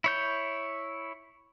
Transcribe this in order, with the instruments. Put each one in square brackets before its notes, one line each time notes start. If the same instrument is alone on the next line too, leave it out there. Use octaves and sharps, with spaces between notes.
[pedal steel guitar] E4 C#5 G6